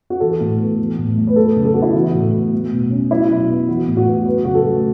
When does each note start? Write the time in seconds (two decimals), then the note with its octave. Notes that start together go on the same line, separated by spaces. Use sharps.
0.10 F#4
0.20 E3 A4
0.40 A2
0.60 B3
0.78 E3
0.98 A2
1.17 A3
1.27 B4
1.36 F#3 A4
1.56 C#3
1.65 A4
1.74 B3 F#4
1.82 E4
1.90 E3 F#4
2.14 A2
2.33 B3
2.53 A3
2.72 B2
2.90 C#4
3.10 F#3 E4
3.30 B2
3.49 B3
3.68 E3 F#4
3.88 A2
3.97 F#4
4.06 B3
4.25 F#3 B4
4.45 C#3 F#4
4.55 A4
4.65 A3